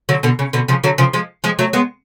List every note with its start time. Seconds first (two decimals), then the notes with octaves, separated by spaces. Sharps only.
0.09 D3 F#3
0.23 B2 D3
0.39 C#3
0.53 B2 D3
0.68 C#3 F3
0.84 D3 F#3
0.98 C#3 F3
1.13 F3 G#3
1.44 F3 G#3
1.59 F#3 A3
1.73 G#3 B3